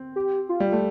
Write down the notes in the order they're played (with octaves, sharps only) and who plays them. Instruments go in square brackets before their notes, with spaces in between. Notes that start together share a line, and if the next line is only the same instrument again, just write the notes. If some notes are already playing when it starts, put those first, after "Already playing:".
Already playing: [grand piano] C4
[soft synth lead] G4
F4
[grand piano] G3
A3